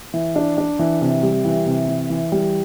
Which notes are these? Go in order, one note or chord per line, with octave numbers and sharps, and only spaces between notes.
E3
D4
D4
E3
C3
G3
E3
C3
E3
E3
G3